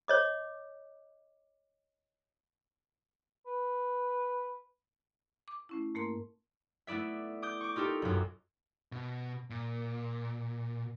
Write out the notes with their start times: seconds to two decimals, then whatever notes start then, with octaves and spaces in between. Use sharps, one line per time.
0.08 C#5 D#5 D6
3.47 B4
5.48 D6
5.69 A3 C#4 E4
5.95 G#2 A3 A#3 A#4 C6
6.87 A3 B3 E4 D5 E5
7.42 D6 D#6 G6
7.61 C#6 D6
7.76 D#4 F4 G4 A4 A#4
8.02 B1 F#2
8.92 B2
9.50 A#2